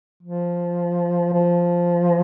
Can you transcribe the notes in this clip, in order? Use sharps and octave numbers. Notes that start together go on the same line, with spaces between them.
F3
F3